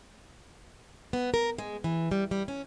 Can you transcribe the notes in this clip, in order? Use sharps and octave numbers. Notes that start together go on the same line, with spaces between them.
B3
A#4
G#3
E3
G3
G3
C#4